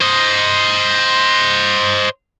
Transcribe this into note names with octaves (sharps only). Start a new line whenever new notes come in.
C5 D#5